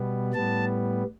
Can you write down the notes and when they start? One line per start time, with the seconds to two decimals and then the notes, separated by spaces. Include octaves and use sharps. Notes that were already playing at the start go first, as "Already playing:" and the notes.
Already playing: B2 G3 B3
0.33 A2 G3 B3 A5